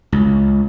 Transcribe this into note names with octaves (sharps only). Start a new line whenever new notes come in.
C#2